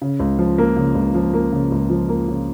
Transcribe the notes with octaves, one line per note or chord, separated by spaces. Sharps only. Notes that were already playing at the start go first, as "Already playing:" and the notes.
C#3
C#2
F3
A#3
C#3
C#2
F3
A#3
C#3
C#2
F3
A#3
C#3